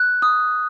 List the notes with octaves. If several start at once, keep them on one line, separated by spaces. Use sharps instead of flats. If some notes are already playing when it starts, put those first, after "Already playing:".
Already playing: F#6
D#6